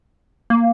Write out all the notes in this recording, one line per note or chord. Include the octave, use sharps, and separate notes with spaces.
A#3